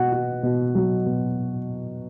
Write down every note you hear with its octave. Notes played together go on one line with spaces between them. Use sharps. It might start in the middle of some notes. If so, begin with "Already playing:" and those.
Already playing: B2 F#4
F#4
B2
F#3
B2